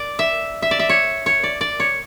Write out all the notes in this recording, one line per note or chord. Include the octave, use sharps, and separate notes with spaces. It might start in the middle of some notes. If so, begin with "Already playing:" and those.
Already playing: D5
E5
E5
D5
E5
C#5
C#5
D5
D5
C#5